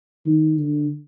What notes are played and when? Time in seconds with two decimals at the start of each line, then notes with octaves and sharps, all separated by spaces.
0.26 D#3
0.58 D3